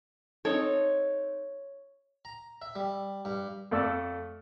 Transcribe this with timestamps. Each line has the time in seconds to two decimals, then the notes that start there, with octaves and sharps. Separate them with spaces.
0.45 C4 D#4 A4 C#5
2.25 A#5
2.62 E5
2.75 G3
3.25 G2
3.71 F2 A3 D5 E6